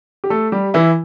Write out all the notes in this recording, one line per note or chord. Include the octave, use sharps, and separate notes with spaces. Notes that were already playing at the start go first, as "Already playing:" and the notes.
G4
A3 A4
G3 G4
E3 E4